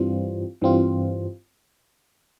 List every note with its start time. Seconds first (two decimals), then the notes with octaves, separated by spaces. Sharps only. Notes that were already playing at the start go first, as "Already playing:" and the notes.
Already playing: G2 E3 G3 C4 F4
0.61 G2 E3 G3 C4 F4